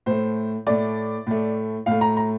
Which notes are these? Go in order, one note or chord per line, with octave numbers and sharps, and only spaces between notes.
A2 A3 C5
A2 A3 D5
A2 A3
A2 A3 F5
A#5
A#5